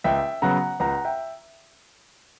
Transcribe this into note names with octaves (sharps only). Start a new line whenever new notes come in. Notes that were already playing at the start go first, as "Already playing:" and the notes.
C#2 E5 G5
C#3 F#3 B3 F#5 A#5
C#2 F#5 A#5
E5 G5